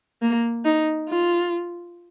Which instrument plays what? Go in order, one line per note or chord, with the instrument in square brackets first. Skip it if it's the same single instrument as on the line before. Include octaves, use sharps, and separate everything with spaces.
[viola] A#3
D#4
F4